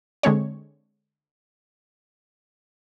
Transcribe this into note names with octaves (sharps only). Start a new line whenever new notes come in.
D3 G#3 C4 C#5